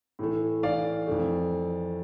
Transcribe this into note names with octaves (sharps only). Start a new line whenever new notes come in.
A2 E3 A3
A2 E3 A3 D5 F5
F2 E3 A3